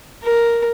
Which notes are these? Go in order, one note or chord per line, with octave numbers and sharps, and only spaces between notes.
A#4